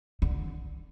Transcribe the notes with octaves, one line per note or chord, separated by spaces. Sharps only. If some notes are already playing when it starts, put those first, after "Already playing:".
D3